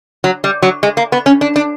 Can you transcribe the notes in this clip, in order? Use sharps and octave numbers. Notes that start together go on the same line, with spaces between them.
F#3
G3
F#3
G#3
A#3
B3
C#4
D4
D4